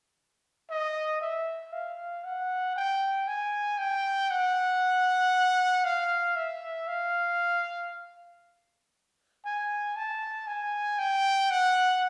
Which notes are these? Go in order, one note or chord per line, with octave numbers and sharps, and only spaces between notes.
D#5
E5
F5
F#5
G5
G#5
G5
F#5
F5
E5
F5
G#5
A5
G#5
G5
F#5